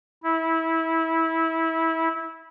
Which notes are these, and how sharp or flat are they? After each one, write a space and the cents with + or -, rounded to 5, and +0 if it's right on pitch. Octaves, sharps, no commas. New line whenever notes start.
E4 -20